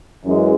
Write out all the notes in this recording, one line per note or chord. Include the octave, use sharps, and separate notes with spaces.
F#2 E3 G#3